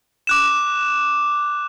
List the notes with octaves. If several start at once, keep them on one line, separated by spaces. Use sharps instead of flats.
D6 F#6 E7